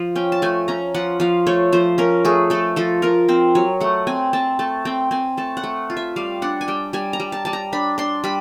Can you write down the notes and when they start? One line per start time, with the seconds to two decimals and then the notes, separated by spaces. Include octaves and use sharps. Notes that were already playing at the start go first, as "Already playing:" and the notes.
Already playing: F3
0.15 C#4 G5
0.32 A5
0.42 A3 G#5
0.68 C#4 A#5
0.94 F3 F#5
1.20 F3 F5
1.47 A3 C#5
1.72 F3 C5
1.98 C#4 A#4
2.25 A3 G#4
2.50 A3 A4
2.76 F3 A4
3.02 F4 A#4
3.29 C4 C5
3.55 F#3 C#5
3.80 A3 F#5
4.07 C4 G#5
4.33 C4 A5
4.59 A3 A5
4.85 C4 G5
5.11 C4 G#5
5.37 A3 A5
5.57 F#5
5.64 A3
5.90 F4
5.97 E5
6.16 G3 F5
6.42 D4 F#5
6.61 G#5
6.68 G3 G5
6.93 G3 G#5
7.13 A#5
7.20 G3
7.32 A5
7.45 G3 A5
7.53 A#5
7.73 D4 B5
7.98 D4 C6
8.24 G3 B5